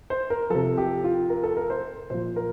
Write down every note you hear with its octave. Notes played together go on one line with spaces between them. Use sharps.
C5
A#4
C3 F3 A4
G4
F4
A#4
A4
A#4
C5
A#2 F3 C5
A#4